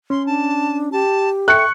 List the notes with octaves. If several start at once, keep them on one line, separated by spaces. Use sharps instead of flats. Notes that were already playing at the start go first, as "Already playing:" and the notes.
C#4 C6
D4 A5
G4 A5
A4 E5 G5 C#6 F#6 C#7